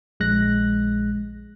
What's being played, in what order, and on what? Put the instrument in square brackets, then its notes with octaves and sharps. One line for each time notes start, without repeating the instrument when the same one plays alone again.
[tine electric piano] A#1 G#3 F#6 A#6